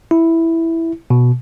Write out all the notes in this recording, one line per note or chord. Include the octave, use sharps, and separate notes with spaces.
E4
B2